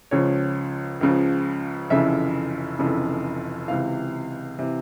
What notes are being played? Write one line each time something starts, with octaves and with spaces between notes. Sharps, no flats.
C#2 C#3 F3 C#5
C#2 C#3 F3
F1 F2 C#3 E3 E5
F1 F2 C#3 E3
C#2 C3 E3 F5
C3 E3